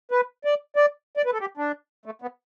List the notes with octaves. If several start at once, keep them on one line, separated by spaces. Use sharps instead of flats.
B4
D5
D5
D5
B4
A4
G4
D4
A3
B3